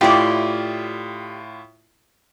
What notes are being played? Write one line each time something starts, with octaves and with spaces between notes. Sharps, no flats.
A2 E4 F4 G4 D5